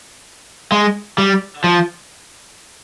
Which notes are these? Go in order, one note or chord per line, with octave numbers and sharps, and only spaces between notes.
G#3
G3
F3